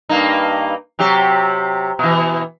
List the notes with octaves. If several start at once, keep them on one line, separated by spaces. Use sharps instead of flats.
G2 A#3 D#4
C3 F#3 G4
B2 E3